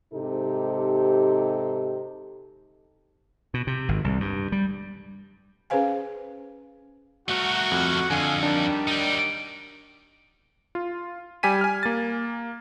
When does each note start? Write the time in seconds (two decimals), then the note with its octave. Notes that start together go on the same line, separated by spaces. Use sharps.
0.13 G#2 C3 D#4 G4 A4
3.54 B2
3.67 C3
3.89 G#1
4.04 C2
4.20 G2
4.52 G3
5.70 C#4 G#4 B4 C5 F5 G#5
7.29 A3 F#4 A#4
7.71 F2
8.10 F2 D3 F5 F#5 G#5
8.43 D#3 F#3 G3 D4
8.88 D#4 G4
10.75 F4
11.43 G3 G4 G#5 B6 D#7
11.61 G#5 F6
11.83 A#3 A6